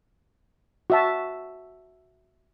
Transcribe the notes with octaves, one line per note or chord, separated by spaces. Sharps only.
F#4 E5 A5